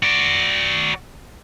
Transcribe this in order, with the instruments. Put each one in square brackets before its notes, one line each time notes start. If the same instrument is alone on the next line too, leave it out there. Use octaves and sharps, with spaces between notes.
[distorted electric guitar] F#4 D5